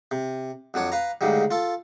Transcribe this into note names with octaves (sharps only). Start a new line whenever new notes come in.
C3
F2 F#3 D4 C#5
B4 F5 A#5
D2 G#2 C#3 F#3 G3
F4 A4